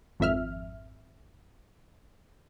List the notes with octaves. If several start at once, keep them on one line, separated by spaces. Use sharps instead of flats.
G#1 F2 E5 F6